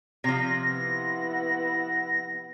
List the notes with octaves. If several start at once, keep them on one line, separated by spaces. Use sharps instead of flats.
C3 F3 A#6
B3 E4